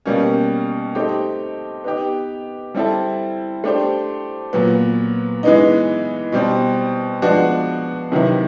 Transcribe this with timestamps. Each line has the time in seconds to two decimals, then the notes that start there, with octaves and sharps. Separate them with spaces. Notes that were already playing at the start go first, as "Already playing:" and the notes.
0.06 B2 G3 A#3 C#4
0.95 A3 C4 D#4 G4
1.84 B3 D#4 G4
2.75 G3 C4 E4 A4
3.64 A3 D4 G4 C5
4.53 A#2 F#3 B3
5.43 E3 G#3 B3 D#4
6.32 B2 G3 C4
7.22 F3 G#3 B3 D4 F#4
8.12 C3 D#3 F#3 B3 E4